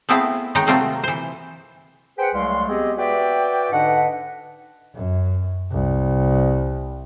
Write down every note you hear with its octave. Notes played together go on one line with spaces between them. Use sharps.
A3 B3 C4 E4 G#4 F5
D#3 G#3 D#4 C#5 G5 A#5
C3 F#3 A3 A#3 C4 F4
E3 C5
G#4 B4 C5 F#5 G5
C2 F#3 G#3 A3 F5 C6
G#3 B3 C4 G4 G#4 D#5
F#4 B4 D5 E5 G5
G#2 D3 D4 B4 D#5 F#5
F#2
C2